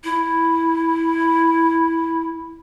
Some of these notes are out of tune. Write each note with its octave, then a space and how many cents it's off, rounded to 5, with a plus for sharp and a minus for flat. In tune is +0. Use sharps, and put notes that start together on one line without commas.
E4 -5